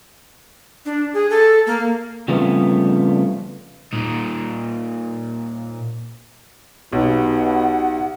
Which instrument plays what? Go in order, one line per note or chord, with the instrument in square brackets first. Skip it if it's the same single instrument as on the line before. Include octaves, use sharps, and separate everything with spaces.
[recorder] D4
G#4
A4
A#3
[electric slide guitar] C#3 F3 G3 A3 B3 C4
[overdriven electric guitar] A#2 D#4
[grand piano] B1 [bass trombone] B2 [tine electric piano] D#4 G4 [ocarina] F#5